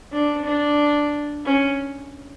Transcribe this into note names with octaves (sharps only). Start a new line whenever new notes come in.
D4
D4
C#4